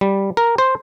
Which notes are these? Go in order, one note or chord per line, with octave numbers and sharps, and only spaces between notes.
G3
A#4
C5